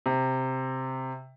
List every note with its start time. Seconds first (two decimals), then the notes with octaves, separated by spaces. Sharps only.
0.06 C3